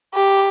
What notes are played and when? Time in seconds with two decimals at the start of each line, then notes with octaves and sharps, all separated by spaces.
0.14 G4